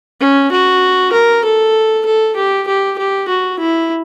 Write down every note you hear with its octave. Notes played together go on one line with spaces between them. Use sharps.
C#4
F#4
A#4
A4
A4
G4
G4
G4
F#4
E4